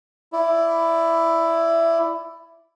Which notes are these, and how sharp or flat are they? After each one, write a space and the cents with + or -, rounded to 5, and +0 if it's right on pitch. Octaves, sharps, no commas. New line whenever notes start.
E4 +10 D5 +0